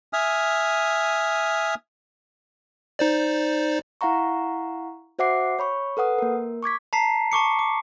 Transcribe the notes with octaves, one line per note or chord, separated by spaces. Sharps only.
E5 G#5 D#6 F6
D#4 C5 D5
E4 F5 F#5 A#5 C#6
F#4 C5 E5 F#5 D6 C7
C#5 B5 C#6
A4 B4 F#5 D#6
A#3 A#4
C#6 D6 G#6 B6
A5 A#5 B6 C7
A5 C#6 D6 C#7
D6